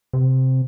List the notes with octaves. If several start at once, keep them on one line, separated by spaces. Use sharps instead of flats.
C3